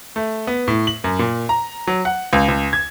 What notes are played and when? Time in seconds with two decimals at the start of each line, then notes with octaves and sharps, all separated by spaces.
0.16 A3
0.47 B3
0.68 A2
0.87 F#7
1.04 F#2
1.19 A#2
1.49 A#5
1.87 F#3
2.05 F#5
2.33 C#2
2.48 C#2
2.73 G#6